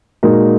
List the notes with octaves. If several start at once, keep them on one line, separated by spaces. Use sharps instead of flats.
A#2 G#3 D#4 F#4 A#4